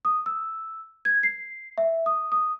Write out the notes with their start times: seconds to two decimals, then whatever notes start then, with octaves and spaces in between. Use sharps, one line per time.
0.05 D#6
0.26 E6
1.05 G#6
1.23 C7
1.78 E5
2.06 D#6
2.32 D#6